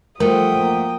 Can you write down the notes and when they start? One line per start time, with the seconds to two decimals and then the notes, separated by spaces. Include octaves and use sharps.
0.20 F3 G3 A3 F#4 A#4 G5 D#6
0.60 A#3